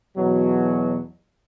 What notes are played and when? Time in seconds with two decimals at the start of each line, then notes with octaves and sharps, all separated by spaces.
0.16 E2 B2 F#3